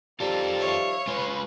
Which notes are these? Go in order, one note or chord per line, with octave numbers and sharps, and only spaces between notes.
D#3 F3 G3 F4 A4 A#5
C#5 E5 F5
G#3 F4 B4 B5